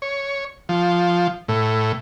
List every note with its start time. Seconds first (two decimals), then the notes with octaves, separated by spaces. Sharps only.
0.02 C#5
0.69 F3
1.48 A2